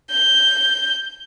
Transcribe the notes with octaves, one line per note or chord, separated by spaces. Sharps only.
G6